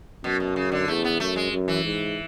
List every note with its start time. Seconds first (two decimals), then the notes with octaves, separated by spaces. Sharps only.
0.24 F#2 B2
0.40 B2
0.56 C#3
0.72 D3
0.88 E2 A3
1.04 B3
1.20 F#2 A3
1.36 G#3
1.51 F#2
1.68 E3
1.85 G#2